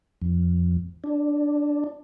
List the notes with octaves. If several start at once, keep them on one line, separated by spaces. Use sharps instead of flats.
F2
D4